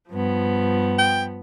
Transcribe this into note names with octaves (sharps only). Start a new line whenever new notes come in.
G2 F3 B3
G5